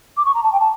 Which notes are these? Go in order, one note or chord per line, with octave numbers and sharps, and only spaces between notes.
D6
C#6
A#5
A5
G5
A5